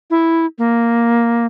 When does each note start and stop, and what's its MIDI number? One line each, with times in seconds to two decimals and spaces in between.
0.10 0.46 64
0.58 1.46 58